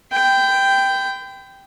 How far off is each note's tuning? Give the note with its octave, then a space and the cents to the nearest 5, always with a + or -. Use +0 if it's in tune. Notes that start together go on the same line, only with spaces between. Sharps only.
G5 +0 B5 +45